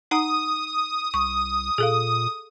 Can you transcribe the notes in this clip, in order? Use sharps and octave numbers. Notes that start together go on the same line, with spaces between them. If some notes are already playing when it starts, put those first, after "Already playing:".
D#4 F#5 A#5 D#6
C2 C#6
A#2 G#4 A4 F5